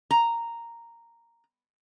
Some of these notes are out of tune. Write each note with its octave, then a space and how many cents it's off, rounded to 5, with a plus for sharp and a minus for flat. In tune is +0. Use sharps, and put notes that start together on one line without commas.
A#5 -5